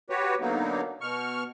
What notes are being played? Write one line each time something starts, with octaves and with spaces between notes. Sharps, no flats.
F#4 G4 B4 C#5
D3 F#3 A#3 B3 D#4
B2 C#6 F6